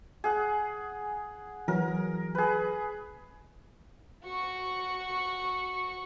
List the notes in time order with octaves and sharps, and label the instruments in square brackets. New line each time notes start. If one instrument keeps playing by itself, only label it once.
[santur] G#4 F#5
[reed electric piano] E3 F#3 [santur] A#4
[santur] G#4 B4
[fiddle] F#4 C#6